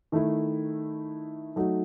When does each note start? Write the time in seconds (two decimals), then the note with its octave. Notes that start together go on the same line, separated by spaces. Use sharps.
0.12 D#3 A3 E4
1.56 F#3 A3 D#4 F#4